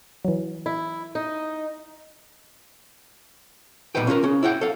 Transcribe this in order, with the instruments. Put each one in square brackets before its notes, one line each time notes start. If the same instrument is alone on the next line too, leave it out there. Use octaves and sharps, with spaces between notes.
[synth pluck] E3 F#3
[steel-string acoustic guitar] E4
D#4
[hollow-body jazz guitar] B1 F#2 A#2 D#4 B4 G5
C#4 F4 G4 A#4
C#3 C#4
E4 C#5 F#5 G5
A4 F5